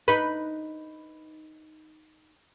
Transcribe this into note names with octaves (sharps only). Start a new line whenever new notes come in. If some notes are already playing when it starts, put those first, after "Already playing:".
D#4 B4